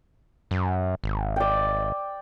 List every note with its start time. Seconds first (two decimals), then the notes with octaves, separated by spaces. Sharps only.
0.51 F#2
1.04 G#1
1.36 D5 G5